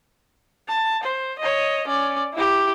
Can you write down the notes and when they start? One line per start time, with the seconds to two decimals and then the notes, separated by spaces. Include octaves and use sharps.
0.68 A5
1.03 C5
1.39 C#5 D#5
1.87 C#4 D5
2.33 E4 G4